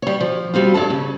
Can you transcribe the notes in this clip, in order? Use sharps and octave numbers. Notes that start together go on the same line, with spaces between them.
G3 C#5
F3
B2 G3 C4 F4
G2 E4 A4 A5
C#3